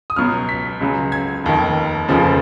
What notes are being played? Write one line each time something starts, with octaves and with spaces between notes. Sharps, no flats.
D#6
C#2 B2 F#3 F6
B6
C#2 C#3 F#3
G#6
F1 D#2 D#3
F1 D#2 C#3 F3